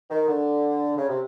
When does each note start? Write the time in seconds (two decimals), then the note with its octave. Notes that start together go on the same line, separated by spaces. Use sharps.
0.10 D#3
0.28 D3
0.97 C#3
1.09 C3